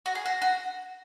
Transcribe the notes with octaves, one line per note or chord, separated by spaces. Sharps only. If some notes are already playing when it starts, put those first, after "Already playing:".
F#4
G#4
F#4
F#4